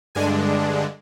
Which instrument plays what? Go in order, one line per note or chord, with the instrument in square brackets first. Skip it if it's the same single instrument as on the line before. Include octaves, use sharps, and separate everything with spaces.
[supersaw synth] G2 D3 G#3 D4 G#5